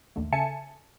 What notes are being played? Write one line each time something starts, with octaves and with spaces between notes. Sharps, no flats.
A1 D#2 D3 A3
C#3 A4 E5 G#5 A5 C#7